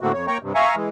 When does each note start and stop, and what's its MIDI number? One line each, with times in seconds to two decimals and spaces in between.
0.01 0.12 45
0.01 0.12 50
0.01 0.12 57
0.01 0.12 58
0.01 0.12 60
0.01 0.12 66
0.13 0.27 41
0.13 0.27 73
0.27 0.38 58
0.27 0.38 73
0.27 0.38 79
0.27 0.38 82
0.27 0.38 85
0.43 0.53 43
0.43 0.53 48
0.55 0.75 76
0.55 0.75 77
0.55 0.75 80
0.55 0.75 82
0.55 0.75 85
0.76 0.89 52
0.76 0.89 56